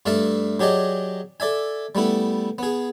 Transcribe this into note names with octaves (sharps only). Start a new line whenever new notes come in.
G2 A3 D4 E5 F5 A5
F#3 G4 G#4 D5 D#5
A4 D5 E5 G#5
G3 A3 B3 E4
B3 G#4